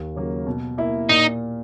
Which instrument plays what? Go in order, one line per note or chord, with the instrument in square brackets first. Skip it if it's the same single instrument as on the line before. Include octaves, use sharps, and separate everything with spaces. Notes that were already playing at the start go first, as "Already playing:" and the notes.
Already playing: [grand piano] D#2
C#3 F#3 A#3
B2
A#3 E4
[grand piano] A#2 [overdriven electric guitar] D#4